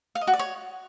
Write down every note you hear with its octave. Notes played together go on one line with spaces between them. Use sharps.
F5
D#5
F#4
D5
C#5